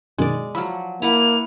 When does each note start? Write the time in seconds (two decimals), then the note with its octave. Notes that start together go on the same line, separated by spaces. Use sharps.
0.18 F#2 B2 D#3 G#3 D5
0.55 F3 F#3 B5 E6 F6
1.02 A#3 E4 B4 F#5 F7